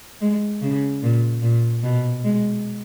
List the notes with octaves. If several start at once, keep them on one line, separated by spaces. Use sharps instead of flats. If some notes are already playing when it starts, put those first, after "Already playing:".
G#3
C#3
A#2
A#2
B2
G#3